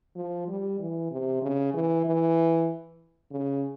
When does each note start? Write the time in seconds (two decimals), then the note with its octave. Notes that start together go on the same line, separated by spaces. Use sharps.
0.16 F3
0.48 G3
0.79 E3
1.11 C3
1.42 C#3
1.73 E3
2.05 E3
3.31 C#3